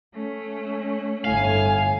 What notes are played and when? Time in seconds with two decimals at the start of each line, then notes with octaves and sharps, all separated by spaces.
0.14 A3 C#4
1.24 G1 A2 F5 G#5